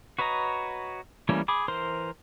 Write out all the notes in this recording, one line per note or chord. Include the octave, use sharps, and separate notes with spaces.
F#4 B4 C#5 D#5 A#5
E3 G3 A3 A#3 C#4
G#4 B5 D6
E3 A#4 C5 C6